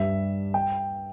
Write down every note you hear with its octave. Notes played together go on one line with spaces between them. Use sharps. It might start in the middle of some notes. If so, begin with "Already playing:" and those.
Already playing: G2 G3 E5
G5